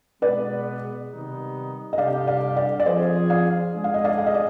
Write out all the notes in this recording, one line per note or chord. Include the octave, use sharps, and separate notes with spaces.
B2 G#3 B3 B4 D5
C3 D#3 G3 B3 D#4
D#5
C3 G3 D4 G4 D5 F5
D5 F5
D5 F5
D5
F3 C4 F4 G#4 C5 D#5
D5 F5
G#3 D4 G#4
F5
D#5
D5 F5
F5
D#5
D5